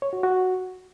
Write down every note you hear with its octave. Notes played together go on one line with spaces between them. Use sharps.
C#5
F#4
F#4